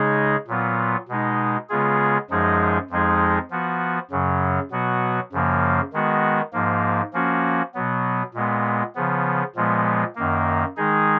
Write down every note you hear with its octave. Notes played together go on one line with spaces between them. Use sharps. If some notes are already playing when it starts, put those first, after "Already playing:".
Already playing: C#3 G#3 D#4 G#4
A#2 F#3 B3 F4
B2 G#3 D#4
C#3 G#3 B3 F4 G#4
F#2 F3 G#3 D#4 G#4
F2 F3 G#3 D#4 G#4
F3 B3 F#4
F#2 C#3 F#3
B2 F#3 B3 F#4
F#2 C#3 F3 A#3
D#3 G#3 B3 F#4
G#2 F3 A#3
F3 A#3 C#4 F#4
B2 F#3 B3
A#2 G#3 B3
C#3 F3 B3
A#2 F3 G#3 B3
F#2 D#3 A#3
D#3 G#3 D#4 G#4